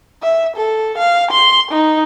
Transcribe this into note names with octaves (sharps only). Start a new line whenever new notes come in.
E5
A4
F5
C6
D#4